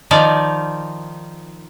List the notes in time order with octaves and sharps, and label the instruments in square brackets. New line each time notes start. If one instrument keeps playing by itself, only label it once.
[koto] D#3 F3 D5